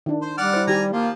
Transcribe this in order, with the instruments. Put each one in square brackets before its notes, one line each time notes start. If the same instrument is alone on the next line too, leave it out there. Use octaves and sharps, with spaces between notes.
[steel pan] D#3 D4
[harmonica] C5
[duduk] G3 [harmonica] D5 F#5 F6
[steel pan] E4 C5
[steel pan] D#3 G4 [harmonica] G#5 A#5
[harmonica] F3 F4 [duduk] A#3